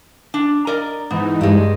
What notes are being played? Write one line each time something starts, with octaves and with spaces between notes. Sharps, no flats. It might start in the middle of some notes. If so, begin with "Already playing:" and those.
D4
A#4 D5 D#5
G#2 E3 B3 D#4
G2 G3 G#3